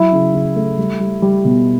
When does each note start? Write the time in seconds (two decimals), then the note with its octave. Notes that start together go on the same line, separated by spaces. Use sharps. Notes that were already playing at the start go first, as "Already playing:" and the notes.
Already playing: F#3 E4
0.12 C#3
0.34 C#3
0.56 A3
0.78 G3
1.00 G3
1.22 G3
1.45 B2